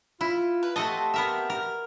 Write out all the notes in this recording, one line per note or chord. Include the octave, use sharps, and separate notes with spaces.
E4 F4
B4
A3 C4 F#4 G4 D#5 A5
B3 A#4 E5
A#4